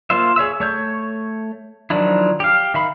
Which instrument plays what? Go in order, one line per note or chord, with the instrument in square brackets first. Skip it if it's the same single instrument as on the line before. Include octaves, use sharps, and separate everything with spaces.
[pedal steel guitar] A#3 F4 C5 E5
G#4 C#5 E5 E6
A3 C#5 G6
D#3 F3 F#3 D4 E4
G4 F5
D#3 E5 F5 B5